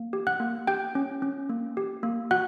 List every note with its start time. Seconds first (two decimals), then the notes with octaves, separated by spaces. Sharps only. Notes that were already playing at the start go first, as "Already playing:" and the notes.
Already playing: A#3
0.13 G4
0.27 F#5 F#6
0.40 A#3
0.67 G4 G5 G6
0.95 C#4
1.22 C#4
1.49 A#3
1.77 G4
2.03 A#3
2.31 F#4 F#5 F#6